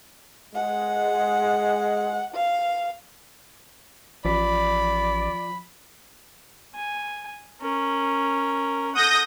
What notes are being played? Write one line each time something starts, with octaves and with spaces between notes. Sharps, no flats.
G#3 F#5
F5
A1 F3 D5 B5 B6
G#5
C#4 A#4
A4 F#5 D#6 G6 A#6